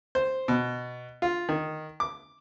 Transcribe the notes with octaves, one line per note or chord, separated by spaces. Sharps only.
C5
B2
F4
D#3
D6